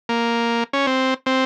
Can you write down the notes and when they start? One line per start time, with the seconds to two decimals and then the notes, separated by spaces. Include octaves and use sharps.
0.09 A#3
0.73 C#4
0.87 C4
1.26 C4